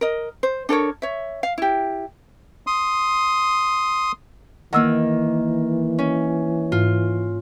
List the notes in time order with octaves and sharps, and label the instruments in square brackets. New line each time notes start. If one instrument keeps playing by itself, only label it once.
[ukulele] A#4 D#5
C5
D4 A4 A#4 C#5
C#5 E5
F5
E4 G4
[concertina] C6 D#6
[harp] D#3 A#3 [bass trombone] E3 [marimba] F#5 E6
[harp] C#4
[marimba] G#2 [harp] F4